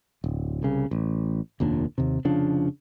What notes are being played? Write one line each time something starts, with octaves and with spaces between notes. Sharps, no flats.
D1
C2 C#3
A1
F1 D#2 A#2 D4
D#2 C3
F1 C#3 F3 D4